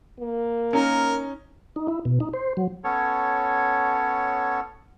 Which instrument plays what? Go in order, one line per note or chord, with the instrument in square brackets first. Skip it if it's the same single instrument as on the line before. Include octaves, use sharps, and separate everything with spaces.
[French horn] A#3
[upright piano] C#4 D#4 [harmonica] A#4
[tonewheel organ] D#4
E4
B2
D#4
C5
F#3
[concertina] B3 C#4 A4 C#5